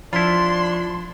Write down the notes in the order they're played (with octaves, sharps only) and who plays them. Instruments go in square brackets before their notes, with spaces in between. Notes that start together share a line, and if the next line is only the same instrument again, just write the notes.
[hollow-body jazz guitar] F3 [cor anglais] D4 [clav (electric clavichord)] E4 F4 [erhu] C6